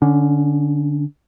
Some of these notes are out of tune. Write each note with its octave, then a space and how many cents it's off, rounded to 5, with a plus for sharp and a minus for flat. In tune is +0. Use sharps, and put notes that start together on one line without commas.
D3 +0 C#4 +25